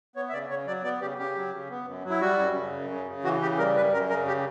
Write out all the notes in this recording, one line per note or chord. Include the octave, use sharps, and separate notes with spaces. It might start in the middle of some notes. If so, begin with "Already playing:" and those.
B3 C#5
E5
C#3 D5
C#3 C#5
F#3 D5
B3 D5
C#3 G4
C#3 G4
F#3
C#3
B3
F#2
F#3
E4
G3 F#4
F#2
C#3
F#2
C#3
C#3
E3 F#4
C#3 G4
G3 A#4
F#2 B4
F#2 A#4
C#3 A#4
G4